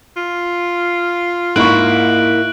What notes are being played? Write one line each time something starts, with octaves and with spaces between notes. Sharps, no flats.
F4
G#2 A#3 E4 C#6 F#6 D7 F#7